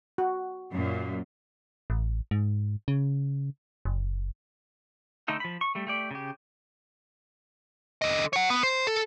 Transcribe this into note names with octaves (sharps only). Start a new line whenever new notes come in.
F#4
F#2 A#2
A1
G#2
C#3
F#1
D3 A3 D#4 A4
F3 B5
C#6
G3 A3
A3 G4 D5
C#3 G4
D3 D#5
C#5 F#5
B3
C5
A4